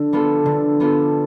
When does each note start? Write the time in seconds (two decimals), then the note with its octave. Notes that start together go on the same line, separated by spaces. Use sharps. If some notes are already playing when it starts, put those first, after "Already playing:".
Already playing: D3
0.13 G3 B3 F4 A4
0.46 D3
0.80 G3 B3 F4 A4